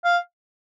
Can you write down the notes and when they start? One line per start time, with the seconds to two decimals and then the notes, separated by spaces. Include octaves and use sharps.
0.05 F5